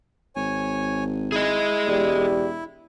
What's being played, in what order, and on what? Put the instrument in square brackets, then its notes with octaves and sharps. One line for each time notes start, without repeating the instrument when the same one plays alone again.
[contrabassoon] G#1 [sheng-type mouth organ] C#5 G#5
[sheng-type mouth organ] E4 [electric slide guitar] G#4 D#5
[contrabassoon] E1 [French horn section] G4 D5